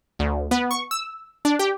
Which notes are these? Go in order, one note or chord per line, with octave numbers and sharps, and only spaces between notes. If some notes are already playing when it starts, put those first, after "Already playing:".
D2
B3
C#6
E6
D4
G4